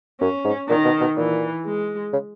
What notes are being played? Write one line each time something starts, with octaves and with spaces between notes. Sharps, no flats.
F#2 C#4
G#2
A#2 D#3
B2
B2
A#2 E3
G#3
C#3